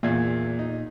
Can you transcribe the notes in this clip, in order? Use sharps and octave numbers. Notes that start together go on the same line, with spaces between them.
E2 A#2 G#6
D#4